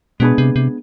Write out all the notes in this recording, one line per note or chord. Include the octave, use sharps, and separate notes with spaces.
B2 G#3 B3 D4 G#4 B4
C3
C3